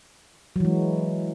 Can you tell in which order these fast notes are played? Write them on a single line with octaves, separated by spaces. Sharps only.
F#3 E3 G#3